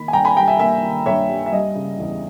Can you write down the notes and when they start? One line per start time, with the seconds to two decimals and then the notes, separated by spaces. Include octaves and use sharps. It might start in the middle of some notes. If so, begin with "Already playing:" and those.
Already playing: D#3 A#3 B5
0.08 G#5
0.13 G2 G5 A#5
0.25 G#5 B5
0.36 G3 G5 A#5
0.48 E5 G#5
0.59 A#3 E5 G#5
0.83 D#3
1.06 G2 C#5 E5
1.29 G3
1.46 E5
1.52 G3 D#5
1.75 C#3
1.99 E2